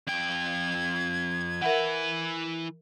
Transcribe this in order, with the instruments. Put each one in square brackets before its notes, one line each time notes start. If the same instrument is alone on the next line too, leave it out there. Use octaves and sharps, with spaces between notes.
[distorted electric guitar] F2 G5 [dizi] G#6
[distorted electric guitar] E3 B4 [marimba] A#4 E5 F#5